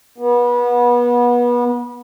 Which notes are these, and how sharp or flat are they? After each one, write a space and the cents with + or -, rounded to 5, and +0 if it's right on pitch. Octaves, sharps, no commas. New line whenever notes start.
B3 -30